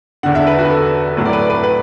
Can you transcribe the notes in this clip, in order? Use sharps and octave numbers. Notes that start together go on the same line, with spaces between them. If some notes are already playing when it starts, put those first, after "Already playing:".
E1 E2 D3 F#5
E5
B4
F#4
B4
A4
A2 F#3 A3 E4 B4
D5
B4
D5
B4
B4